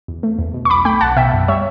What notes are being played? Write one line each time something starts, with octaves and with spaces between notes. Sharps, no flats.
E2
A3
E2
B2
C#6
B1 B5 D6
A3 G5 B5
B1 F#5 A5
B2 E5 G5
F#2
G3 C#5 E5